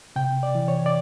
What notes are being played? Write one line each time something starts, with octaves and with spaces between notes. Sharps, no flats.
C3 G5
D5
E3
C#5
D5